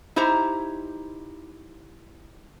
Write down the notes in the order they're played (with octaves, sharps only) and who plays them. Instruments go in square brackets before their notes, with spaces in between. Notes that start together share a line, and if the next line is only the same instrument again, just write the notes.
[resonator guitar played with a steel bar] D#4 E4 G4 C5 A#5